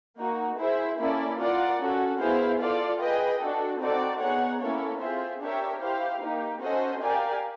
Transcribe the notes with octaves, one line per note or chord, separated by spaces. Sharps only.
A#3 D#4 F#4
E4 G#4 C5 E5
A#3 C#4 E4 A4 D5
F4 A#4 D5 F#5
C#4 F#4 A4
B3 E4 G#4 C5 F5
F4 A4 D5 F5
G#4 B4 D#5 G5
D4 F#4 A4
C4 D#4 F#4 A4 D5
B3 D#4 G#4 C#5 F#5
A#3 C#4 E4 A4 C#5
C4 F4 G#4 C5 E5
D4 G4 A#4 C#5 E5
E4 G4 C5 F5
A#3 D#4 G4
C#4 F#4 A4 C5 D#5
G4 A#4 D5 F5 G#5